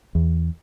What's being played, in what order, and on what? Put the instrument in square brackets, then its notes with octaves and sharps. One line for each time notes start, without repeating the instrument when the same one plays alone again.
[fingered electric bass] E2